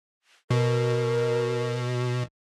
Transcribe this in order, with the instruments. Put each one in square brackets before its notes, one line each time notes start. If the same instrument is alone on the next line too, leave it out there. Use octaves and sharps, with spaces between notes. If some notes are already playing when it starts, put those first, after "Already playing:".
[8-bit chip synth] B2 [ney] A#4